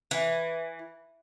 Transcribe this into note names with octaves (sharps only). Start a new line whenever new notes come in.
E3